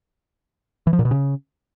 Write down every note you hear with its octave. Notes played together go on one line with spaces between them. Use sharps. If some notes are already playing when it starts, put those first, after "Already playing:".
E3
F3
A#2
B2
C#3